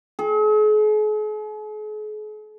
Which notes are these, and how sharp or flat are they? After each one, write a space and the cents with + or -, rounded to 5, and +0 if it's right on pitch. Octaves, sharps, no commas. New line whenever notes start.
G#4 +45